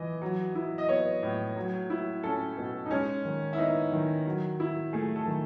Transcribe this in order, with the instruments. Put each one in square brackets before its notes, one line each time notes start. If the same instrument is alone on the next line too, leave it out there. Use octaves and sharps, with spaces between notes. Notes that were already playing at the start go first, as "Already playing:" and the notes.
Already playing: [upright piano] E3 [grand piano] D#5
[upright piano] F#3
E4
[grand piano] D#5
[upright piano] B3 [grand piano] C#5
[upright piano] A2
F#3
E4
[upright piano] C#4 [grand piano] A4
[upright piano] B2
[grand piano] D#4
[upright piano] G#3 [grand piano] C#4
[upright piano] D#3
[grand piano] E4
[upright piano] B3 [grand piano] D#4
[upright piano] D#3
F#3
E4
[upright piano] A3 [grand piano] G#4
[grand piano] A4
[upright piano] D#3